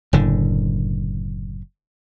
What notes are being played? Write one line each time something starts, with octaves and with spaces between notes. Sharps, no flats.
F#1 A2 D3